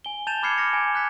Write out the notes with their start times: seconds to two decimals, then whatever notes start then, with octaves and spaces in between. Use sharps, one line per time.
0.05 G#5 G7
0.27 A5 G6 A6 E7 F7 G7
0.43 B5 D6 F6 G#6 C7 C#7
0.58 D6 F6 A#6 C#7
0.73 G#5
0.95 F#6 G#6 B6 C#7